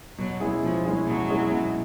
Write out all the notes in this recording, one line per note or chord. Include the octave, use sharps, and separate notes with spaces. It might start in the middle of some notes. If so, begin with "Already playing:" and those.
B2 F#3
G#3 C#4 E4 G#4
B2 F3
G#3 C#4 E4 G#4
B2 F#3
G#3 C#4 E4 G#4
B2